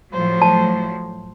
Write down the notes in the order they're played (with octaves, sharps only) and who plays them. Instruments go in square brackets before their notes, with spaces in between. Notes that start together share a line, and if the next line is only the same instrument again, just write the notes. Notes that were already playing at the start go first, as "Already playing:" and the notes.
[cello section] A2 F3 F#3 [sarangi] C5
[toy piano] A5